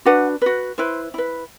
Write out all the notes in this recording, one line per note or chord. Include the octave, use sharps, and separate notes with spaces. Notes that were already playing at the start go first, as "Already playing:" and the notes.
D4 F#4 B4 F#5
F#4 B4
E4 B4 C5
E4 B4